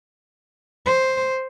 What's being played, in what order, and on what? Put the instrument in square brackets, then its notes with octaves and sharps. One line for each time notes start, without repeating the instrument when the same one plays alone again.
[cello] C5